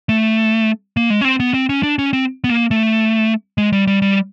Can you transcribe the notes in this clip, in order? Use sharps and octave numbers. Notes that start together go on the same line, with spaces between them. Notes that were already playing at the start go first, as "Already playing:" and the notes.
A3
A#3
G#3
C#4
C4
B3
C4
C#4
D4
C#4
C4
B3
A#3
A3
G#3
G3
G3
G3